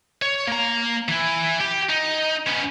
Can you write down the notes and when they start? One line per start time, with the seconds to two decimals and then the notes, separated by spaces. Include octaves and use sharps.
0.22 C#5
0.48 A#3 A#5
1.08 E3 E4
1.61 G4
1.90 D#4
2.47 B3 C#4